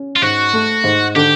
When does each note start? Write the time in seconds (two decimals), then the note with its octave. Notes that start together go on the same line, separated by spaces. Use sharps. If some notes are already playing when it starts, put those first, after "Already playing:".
Already playing: C#4
0.16 F4
0.22 G#2 F#4
0.53 A3
0.84 G#2
1.16 D3 G4